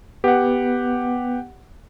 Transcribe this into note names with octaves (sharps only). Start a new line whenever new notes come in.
B3 G4 F#5